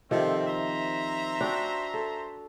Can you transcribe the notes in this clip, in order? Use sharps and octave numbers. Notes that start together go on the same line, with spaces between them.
C3 D#3 F3 G3 A3 C4
C5 E5 A#5
D4 F#4 G5
A4